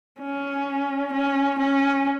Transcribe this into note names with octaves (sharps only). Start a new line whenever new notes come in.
C#4
C#4
C#4